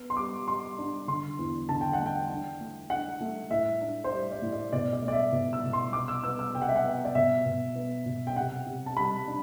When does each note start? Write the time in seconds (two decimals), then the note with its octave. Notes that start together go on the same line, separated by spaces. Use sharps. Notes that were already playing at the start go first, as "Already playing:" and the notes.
Already playing: B3
0.10 C6
0.17 G3 D6
0.47 G3 C6
0.78 D4
1.08 D3 C6
1.39 E2
1.69 D3 A5
1.81 G5
1.93 F#5
1.99 A3
2.06 G5
2.29 D4
2.60 A3
2.90 D4 F#5
3.21 A3
3.51 A2 E5
3.81 D4
4.04 C5
4.12 G3 D5
4.32 D5
4.42 A2
4.53 D5
4.73 B2 D5
4.93 D5
5.02 A3
5.08 D5
5.13 E5
5.32 B2
5.53 E6
5.63 B2
5.73 C6
5.93 C3 D6
6.08 E6
6.24 B3 E6
6.39 E6
6.54 C3 G5
6.62 F#5
6.68 E5
6.76 F#5
6.85 B3 E5
7.05 D5
7.15 B2 E5
7.46 B2
7.75 B3
8.06 B2
8.27 G5
8.36 C3 F#5
8.66 C3
8.86 A5
8.97 G3 B5
9.27 D4